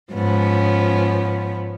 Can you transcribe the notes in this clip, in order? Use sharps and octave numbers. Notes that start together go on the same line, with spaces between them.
G#2 F3 B3 C#4